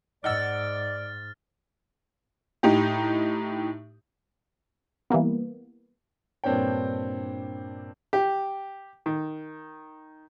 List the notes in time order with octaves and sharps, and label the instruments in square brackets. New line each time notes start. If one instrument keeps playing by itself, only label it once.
[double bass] G#2 [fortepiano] D#4 F#5 E6 [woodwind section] D5 [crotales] F6 A6
[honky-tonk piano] A2 D#4 G4
[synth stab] E3 G3 A#3 B3
[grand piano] G2 A#2 C4 D4 C#5 G5
[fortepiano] G4
D#3